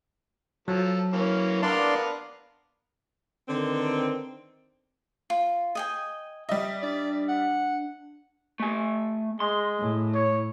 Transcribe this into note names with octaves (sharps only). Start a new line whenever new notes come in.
F3 F#3 A4
E3 A#3 C#4
B3 D4 A#4 D5 F5 C6
D3 D#3 B3 C4
F4
D#5 G5 G#5
G3 D#5 E5
D4 D5
F#5
A3 G#5
G#3 C6
A2
C#5